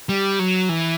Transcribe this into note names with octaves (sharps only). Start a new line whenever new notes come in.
G3
F#3
E3